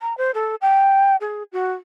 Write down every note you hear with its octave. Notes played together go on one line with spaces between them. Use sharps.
A#5
C5
A4
G5
G#4
F#4